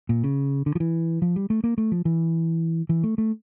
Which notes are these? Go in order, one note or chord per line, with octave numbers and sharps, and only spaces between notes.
A#2
C#3
D3
F3
E3
F3
G3
A3
A#3
A3
F3
E3
E3
A3
A3